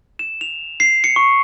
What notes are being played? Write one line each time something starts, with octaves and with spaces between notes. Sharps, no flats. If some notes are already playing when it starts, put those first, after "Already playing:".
E7
F7
C7
C#7
C#6